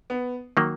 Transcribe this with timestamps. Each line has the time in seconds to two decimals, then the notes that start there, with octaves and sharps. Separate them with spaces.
0.10 B3
0.57 D#3 F#3 A#3